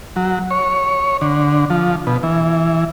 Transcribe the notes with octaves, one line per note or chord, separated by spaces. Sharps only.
F#3
C#5
D3
F3
B2
E3